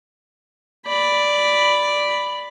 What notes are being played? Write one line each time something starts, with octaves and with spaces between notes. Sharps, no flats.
D5 B5